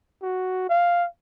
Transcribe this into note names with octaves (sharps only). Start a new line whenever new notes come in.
F#4
F5